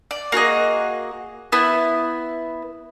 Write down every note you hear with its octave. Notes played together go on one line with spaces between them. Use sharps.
D5
A#3 F#4 G#4 D#5
B3 E4